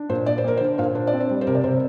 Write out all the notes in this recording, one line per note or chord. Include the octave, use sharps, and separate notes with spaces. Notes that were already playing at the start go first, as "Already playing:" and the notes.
Already playing: D4
A#2 C5
A#2 D5
C5
A#3 A#4
C5
D3
A#2 C5 F5
D4 C5
D5
C4
C5
G3
C5
C3 A#4
D5
C3 C5